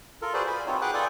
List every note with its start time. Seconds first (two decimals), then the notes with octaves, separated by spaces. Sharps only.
0.22 F4 A4 A#4
0.34 F#4 G#4 B4 C5 D5
0.47 G#5 B5
0.67 C4 D#4 F4 F#4 C#5
0.82 G#4 B4 F#5 G5 D6 F#6
0.94 F4 A4 D5 G5 G#5 D#6